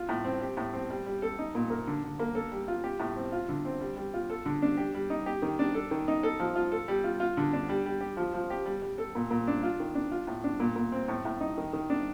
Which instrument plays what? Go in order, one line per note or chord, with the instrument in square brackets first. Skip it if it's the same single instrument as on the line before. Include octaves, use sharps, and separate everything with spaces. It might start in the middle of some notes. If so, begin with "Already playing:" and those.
Already playing: [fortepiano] F4
A2
C4
G4
A2
C4
G3
G3
A4
D#4
A#2
A#3
D3
D3
A#3
A4
G3
F4
G4
A2
C4
F4
D3
C4
G3
G3
F4
A4
D3
D4
G4
G3
D#4
G4
D#3
D4
A4
D#3
D#4
A4
F3
F4
A4
G3
F4
F4
D3
D4
G3
G3
G4
F3
F3
G4
G3
G3
A4
A#2
A#2
D4
F4
D#3
D4
F4
A2
D4
A#2
A#2
C4
A2
A2
D#4
D#3
D#3
D4